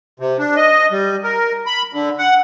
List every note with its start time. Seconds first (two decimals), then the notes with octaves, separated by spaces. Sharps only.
0.20 C3
0.39 D4
0.57 D#5
0.91 G3
1.24 A#4
1.66 B5
1.93 D3
2.19 F#5